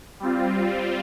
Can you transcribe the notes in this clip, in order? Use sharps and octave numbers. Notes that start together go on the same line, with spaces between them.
G3 C4 F4